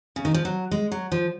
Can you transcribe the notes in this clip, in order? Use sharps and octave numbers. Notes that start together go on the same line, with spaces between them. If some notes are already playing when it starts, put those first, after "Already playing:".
C#3
D#3
F3
F#3
G#3
F#3
F3